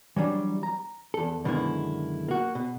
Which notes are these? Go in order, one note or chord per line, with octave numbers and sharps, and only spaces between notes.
E3 F#3 G3 D4
A#5
E2 A4
F#2 B2 D3 D#3 G#3 E4
A#3 F#4
B2